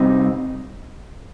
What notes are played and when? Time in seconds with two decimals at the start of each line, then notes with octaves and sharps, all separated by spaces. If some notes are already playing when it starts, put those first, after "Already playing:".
Already playing: C3 G3 C4 D#4